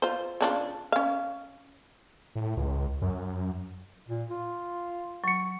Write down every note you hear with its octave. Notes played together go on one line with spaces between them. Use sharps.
F4 C5
C#3 D4 F4
C#4 F5
A2
C#2
F#2
A#2
F4
F#3 C#6 C#7